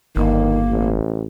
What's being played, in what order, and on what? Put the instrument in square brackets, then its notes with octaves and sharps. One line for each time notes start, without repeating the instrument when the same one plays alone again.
[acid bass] G1 [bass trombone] D#3 [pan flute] A#3
[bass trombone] A1